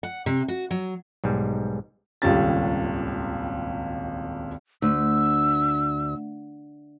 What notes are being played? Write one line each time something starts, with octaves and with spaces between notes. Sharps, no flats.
F#5
C3
F#4
F#3
B1 G#2 G3
D#1 G#1 C#2 G3 C#4 A6
D2 E6